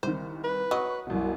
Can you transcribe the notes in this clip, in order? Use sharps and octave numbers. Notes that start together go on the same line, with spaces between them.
C2 D#3 C5
B4
F#3 D#5 C#6
C2 F#2 B2